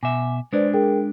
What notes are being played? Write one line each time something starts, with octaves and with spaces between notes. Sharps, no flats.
B2 E5 G#5 D6
G#3 D4 B4 C5 D5
G#4 A#4 G5